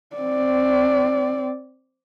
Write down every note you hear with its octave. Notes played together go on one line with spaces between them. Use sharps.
C4 D5